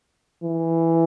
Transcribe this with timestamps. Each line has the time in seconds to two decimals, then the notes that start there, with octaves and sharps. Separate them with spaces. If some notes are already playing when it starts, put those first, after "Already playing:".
0.44 E3